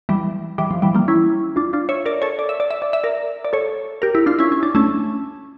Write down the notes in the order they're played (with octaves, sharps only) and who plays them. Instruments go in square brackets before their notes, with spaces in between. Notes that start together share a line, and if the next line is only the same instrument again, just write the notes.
[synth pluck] E3 G3
E3 G3
F3
E3 G3
G3 A#3
C#4 E4
D4 F4
D4 F4
C#5 E5
A#4 D5
A4 C#5
D5
E5
D5
E5
D5
E5
A#4 D5
D5
A4 C#5
G4 A#4
E4 G4
D4 F4
C#4 E4
C#4
D4
A3 C#4